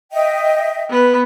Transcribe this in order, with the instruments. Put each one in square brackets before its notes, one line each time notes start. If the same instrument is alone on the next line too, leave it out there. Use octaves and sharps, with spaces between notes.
[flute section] D#5 E5 G5
[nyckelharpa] B3 B4